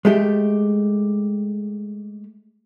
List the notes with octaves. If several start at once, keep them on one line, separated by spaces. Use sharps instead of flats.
G#3 A3 G4